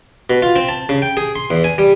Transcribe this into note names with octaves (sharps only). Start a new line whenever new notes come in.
B2
F4
C4
A5
C#3
G5
G#4
C6
E2
G#5
G3